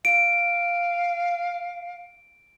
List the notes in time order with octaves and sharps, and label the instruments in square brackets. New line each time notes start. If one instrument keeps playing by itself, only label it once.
[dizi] F5 [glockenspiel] D7